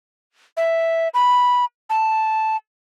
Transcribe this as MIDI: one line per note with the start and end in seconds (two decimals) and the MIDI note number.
0.57 1.08 76
1.14 1.65 83
1.90 2.57 81